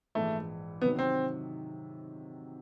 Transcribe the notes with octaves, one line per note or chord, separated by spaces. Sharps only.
A#1 G#2 E3 A3
C3 D#3 F#3 B3
C4